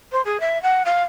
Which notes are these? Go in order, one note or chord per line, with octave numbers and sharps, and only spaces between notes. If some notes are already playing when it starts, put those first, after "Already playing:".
C5
G#4
E5
F#5
F5